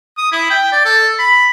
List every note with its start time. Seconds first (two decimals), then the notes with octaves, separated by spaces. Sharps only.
0.18 D#6
0.32 E4
0.50 G5
0.72 D5
0.86 A4
1.19 B5